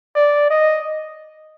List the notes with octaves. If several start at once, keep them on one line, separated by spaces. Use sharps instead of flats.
D5
D#5